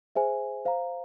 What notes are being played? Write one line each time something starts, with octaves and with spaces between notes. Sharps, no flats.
G#4 C5 E5 G#5
C5 F5 A#5